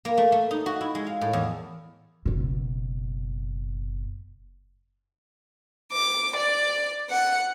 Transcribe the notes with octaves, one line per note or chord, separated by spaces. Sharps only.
A#3
A3
A3
D#4
F#4
E4
G#3
F5
A2
E2
F#1 B2
D6
D5
F#5